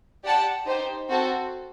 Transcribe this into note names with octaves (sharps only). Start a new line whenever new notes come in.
G4 D5 F#5 A5
D#4 G4 C5
C4 F#4 A4 C5